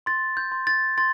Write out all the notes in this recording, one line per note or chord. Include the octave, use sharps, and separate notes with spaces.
C6 A6
G6
C6
A6
C6 A6